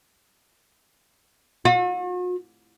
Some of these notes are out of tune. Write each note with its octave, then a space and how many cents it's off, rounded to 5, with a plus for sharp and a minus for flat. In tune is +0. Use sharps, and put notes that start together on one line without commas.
F#4 -45